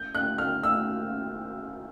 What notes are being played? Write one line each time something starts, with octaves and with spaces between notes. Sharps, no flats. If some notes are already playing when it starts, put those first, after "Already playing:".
Already playing: G6
F#6
F6
E6